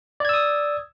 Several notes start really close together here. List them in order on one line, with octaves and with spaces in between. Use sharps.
D5 G#6 E6 D#6